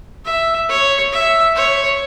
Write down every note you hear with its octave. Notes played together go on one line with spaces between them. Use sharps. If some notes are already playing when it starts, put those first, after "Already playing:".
E5
C#5
E5
C#5